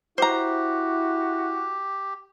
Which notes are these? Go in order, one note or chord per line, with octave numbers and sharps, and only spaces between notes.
E4 F#4 G4 C5 A#5